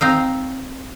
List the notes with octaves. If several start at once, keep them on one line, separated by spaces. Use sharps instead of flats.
C4 D#4 F5